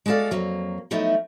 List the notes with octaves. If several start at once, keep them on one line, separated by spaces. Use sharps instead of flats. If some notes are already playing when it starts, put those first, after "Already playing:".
G#3 F#4 A4 D5 F5
F2 F#3 A#3
F3 F#3 A3 B3 D#4 E4